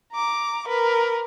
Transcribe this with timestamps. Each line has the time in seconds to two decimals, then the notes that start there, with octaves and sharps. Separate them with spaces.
0.13 A#5 D6
0.68 A#4 B4